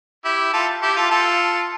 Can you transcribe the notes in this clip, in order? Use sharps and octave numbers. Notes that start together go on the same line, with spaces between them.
E4 G4
F4 A4
E4 G4
F4 A4
F4 A4